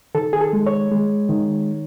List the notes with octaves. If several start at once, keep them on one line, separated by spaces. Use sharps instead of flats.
D#3 A4
G#4
A4
G#3
C#5
G#3
D#3